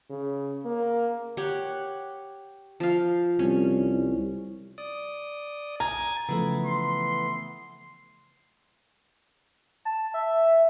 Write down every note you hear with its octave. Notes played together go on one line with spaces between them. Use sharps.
C#3
A#3
G4 C#5 F#5
F3 F5
C2 C#4
D5 D#6
G#5 A#5 G#6 A6
C#3 E3 F3 A3 B3
C6
A5
E5